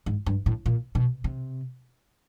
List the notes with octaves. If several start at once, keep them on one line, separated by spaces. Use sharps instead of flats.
G#2
G2
A2
A#2
B2
C3